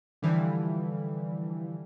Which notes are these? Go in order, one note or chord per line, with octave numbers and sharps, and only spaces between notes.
D3 E3 F3 G3